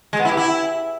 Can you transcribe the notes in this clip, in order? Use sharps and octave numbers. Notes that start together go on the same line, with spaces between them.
G#3
B3
E4
G4
E4